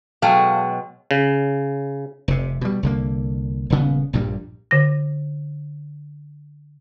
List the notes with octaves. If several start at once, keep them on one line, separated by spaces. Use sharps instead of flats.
B2 F#3 G#3 A4 F5 G5
C#3
F1 C3
B2 G3
C2 D3 A#3
D#1 C#3 B3
A#1 G2 A#2 G3
D3 A#6